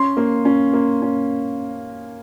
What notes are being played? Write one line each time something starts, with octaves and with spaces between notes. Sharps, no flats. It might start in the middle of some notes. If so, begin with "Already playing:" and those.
Already playing: C#4 C6
A#3
C#4
A#3
C#4